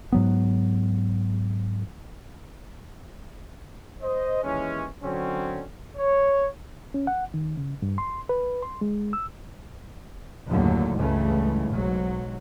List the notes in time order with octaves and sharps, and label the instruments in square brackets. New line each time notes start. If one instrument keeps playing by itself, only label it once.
[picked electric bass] G#2 F#3 B3
[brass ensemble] C5 D#5
D#2 E3 G#3 C#4
D3 F#3 C4 C#4
C#5
[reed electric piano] C#4
F#5
D#3
C#3
G2
C6
B4
C6
G#3
E6
[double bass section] F#1 D#2 A2 D3 D#3 F#3
C#2 G2 C#3 E3 A3
B1 G#2 F#3